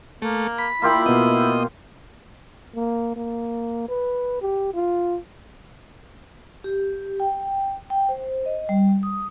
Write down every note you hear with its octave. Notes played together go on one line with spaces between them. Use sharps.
A3 A#3
B5
A#3 E4 F4 G4
B2 B3 D#5
A#3
A#3
B4
G4
F4
G4
G5
G5
C5
D#5
G3
D#6